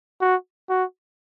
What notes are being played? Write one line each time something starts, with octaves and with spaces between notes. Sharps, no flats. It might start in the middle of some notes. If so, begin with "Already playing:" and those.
F#4
F#4